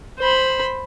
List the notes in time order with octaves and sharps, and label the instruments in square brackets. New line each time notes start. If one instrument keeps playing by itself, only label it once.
[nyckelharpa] C5 B5